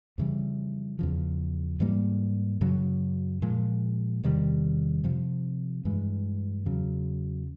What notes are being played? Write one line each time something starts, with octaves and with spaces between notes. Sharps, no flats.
F2 C#3 E3 G3
E2 C#3 F3
G#2 E3 G3 A#3
F#2 C#3 F#3
A#2 F3 G#3
E2 C3 D#3 G3
F2 C3 F3
G2 E3 G#3
E2 C#3 F#3